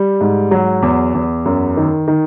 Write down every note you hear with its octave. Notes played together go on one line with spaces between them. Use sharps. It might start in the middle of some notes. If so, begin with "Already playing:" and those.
Already playing: G3
G#2
F#3
E2
E2
F#2
D#3
D#3